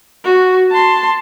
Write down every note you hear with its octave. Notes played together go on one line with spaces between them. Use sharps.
F#4
A5 C6